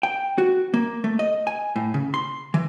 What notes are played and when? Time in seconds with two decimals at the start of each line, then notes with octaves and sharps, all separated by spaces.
0.03 G5
0.38 F#4
0.74 A#3
1.04 A3
1.19 D#5
1.47 G#5
1.76 A2
1.94 C#3
2.14 C6
2.54 E3